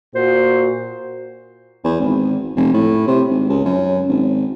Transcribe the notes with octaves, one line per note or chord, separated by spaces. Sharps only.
A#2 F#4 C5
E2
G#1
F1
A2
C3
G#1
C#2
F#2
G#1